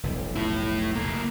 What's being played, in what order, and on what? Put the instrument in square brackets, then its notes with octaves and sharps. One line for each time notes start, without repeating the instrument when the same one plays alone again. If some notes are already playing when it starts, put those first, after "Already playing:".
[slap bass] F1 B1 G3
[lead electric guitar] A3 E4
C#2 A#3